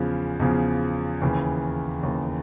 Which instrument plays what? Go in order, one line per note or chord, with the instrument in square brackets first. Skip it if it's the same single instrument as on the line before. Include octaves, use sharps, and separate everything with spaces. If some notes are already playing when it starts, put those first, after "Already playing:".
Already playing: [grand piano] E2 C#3 F3
E2 C#3 F3
D#2 C#3 E3
D#2 C#3 E3